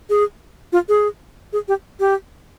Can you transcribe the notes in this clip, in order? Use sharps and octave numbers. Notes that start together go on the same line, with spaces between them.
G#4
F4
G#4
G#4
G4
G4